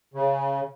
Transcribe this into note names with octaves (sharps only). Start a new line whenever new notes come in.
C#3